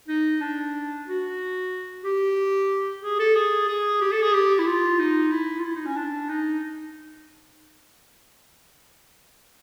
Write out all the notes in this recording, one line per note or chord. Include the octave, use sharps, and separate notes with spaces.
D#4
D4
F#4
G4
G#4
A4
G#4
G#4
G4
A4
G#4
G4
E4
F4
D#4
E4
F4
E4
D#4
C#4
D4
D#4